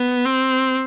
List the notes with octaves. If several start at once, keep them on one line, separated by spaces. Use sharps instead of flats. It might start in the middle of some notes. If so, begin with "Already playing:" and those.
Already playing: B3
C4